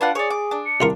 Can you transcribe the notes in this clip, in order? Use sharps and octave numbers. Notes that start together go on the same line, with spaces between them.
D4 F4 B4 F#5
G#4 C#5 D5
D6
D4
C#7
C2 D#3 F4 A#4